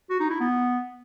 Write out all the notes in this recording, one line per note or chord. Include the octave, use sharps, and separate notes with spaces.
F#4
D#4
E4
B3